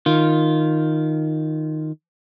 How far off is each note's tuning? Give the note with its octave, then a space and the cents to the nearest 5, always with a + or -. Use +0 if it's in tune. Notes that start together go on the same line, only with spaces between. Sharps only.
D#3 +0 F4 +0